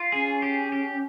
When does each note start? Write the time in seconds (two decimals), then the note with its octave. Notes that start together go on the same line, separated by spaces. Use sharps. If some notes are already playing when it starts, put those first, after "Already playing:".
Already playing: F4
0.12 C#4 G#4
0.42 G4
0.72 G4